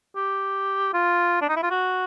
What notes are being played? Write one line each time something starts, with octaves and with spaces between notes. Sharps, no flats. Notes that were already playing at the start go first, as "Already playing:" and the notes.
G4
F4
D4
D#4
E4
F4
F#4